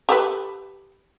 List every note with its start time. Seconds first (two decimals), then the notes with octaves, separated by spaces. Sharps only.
0.09 G4 A4 B4